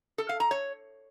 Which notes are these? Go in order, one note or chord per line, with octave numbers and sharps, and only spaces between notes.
A4
F5
A#5
C#5